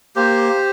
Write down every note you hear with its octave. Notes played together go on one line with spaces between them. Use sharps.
A#3 G4 C5